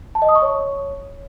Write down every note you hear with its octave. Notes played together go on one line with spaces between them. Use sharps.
A5
D#5
D#6
C#6
C#5